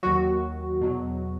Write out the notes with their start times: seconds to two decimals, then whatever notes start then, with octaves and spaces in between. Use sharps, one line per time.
0.03 D#2 D#3 F#3 F#4
0.81 E2 B2 F#3